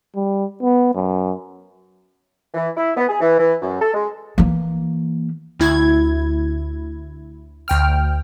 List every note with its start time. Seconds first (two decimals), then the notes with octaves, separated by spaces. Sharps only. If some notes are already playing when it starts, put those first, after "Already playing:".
0.16 G3
0.62 B3
0.95 F#2
2.54 E3
2.77 E4
2.97 B3
3.08 G#4
3.21 E3
3.39 E3
3.62 F#2
3.81 A4
3.94 G#3
4.38 E3 A#3
5.60 D2 E4 G#6
7.68 D2 G5 F6